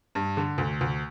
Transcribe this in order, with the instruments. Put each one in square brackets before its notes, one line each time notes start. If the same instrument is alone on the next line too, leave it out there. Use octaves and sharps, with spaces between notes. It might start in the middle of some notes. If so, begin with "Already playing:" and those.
[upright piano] G2
D3
D2
D2